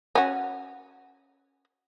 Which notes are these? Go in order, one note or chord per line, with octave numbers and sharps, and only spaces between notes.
C#4 F#4